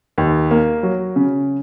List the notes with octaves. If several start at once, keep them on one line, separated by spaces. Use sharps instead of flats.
D#2
A#3
F#3
C#3